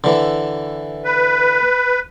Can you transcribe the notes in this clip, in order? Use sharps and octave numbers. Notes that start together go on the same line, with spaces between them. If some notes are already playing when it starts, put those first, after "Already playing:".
D3 E3
B4